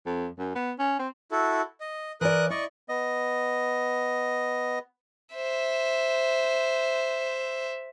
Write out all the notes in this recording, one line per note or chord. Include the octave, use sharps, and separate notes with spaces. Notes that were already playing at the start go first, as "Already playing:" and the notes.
F2
F#2
B3
C#4
C4
E4 F#4 A4
D#5
E3 A#4 D5 D#6 F#6
E4 D5 D#5 C#6
B3 D#5
C5 E5